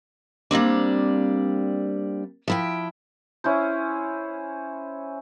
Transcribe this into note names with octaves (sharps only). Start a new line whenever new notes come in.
G3 A#3 C4 D4
F3 E4 G5
C#4 E4 C5